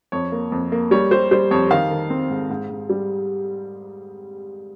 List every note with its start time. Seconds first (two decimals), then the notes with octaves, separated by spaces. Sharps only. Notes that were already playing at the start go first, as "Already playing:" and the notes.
0.12 F2 C#5
0.32 A#3
0.52 F2
0.72 A#3
0.91 G3 C#5
1.11 G3 C5
1.31 G3 C5
1.51 F2 C#5
1.71 D#3 F5
1.90 D#3
2.10 C4
2.30 G#2
2.50 G#2
2.70 G#2
2.90 G3